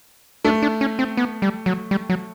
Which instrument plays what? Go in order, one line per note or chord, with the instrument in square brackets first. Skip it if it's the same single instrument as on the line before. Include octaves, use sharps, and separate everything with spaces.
[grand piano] A3 [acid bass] D4
[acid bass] D4
C#4
C4
B3
G3
F#3
G3
F#3